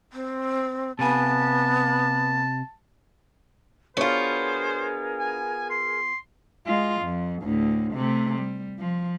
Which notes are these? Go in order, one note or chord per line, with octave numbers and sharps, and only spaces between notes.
C4
C3 B3 G#5 A5
B3 D4 F4 F#4 G#4 A#4 C5 C#5
G#5
C6
G#3 F4
F2
D2 A2
C3 A3
G3
F3